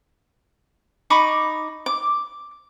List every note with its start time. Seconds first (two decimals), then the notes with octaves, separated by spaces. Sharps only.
1.10 D#4 B5 C#6 D6
1.86 D6